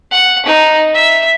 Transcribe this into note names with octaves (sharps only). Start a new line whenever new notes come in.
F#5
D#4
E5